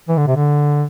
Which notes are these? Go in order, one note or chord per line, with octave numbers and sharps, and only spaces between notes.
E3
D3
C3
D3